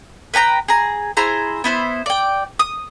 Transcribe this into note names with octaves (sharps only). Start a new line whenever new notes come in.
B4 G5 A5 A#5
G#4 A#5
E4 G#4 C5 A#5
B3 E4 C5
D5 G5
D#6